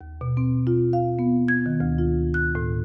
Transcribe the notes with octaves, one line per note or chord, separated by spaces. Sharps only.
D#2
B2
C4
F4
F5
B3
G#6
D#3
D2
F4
F#6
A2